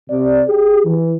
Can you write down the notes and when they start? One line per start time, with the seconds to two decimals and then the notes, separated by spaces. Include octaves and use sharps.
0.10 C3 D5
0.47 G4 G#4
0.85 E3